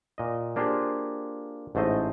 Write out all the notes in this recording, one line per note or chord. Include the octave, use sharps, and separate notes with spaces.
A#2 D#5
A#3 D4 F4 G4 G#4 C5
A1 G#2 A3 C5 D#5